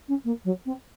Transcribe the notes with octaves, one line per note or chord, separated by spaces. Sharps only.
C#4
A#3
F#3
C4